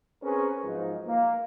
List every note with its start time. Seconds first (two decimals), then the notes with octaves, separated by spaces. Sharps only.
0.23 C4 C#4 G#4 A#4 B4
0.64 G#2 F3 F#3 D#4
1.07 A#3